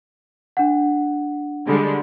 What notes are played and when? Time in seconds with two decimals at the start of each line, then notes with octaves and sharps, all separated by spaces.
0.57 D4 F#5
1.67 D3 G3 G#3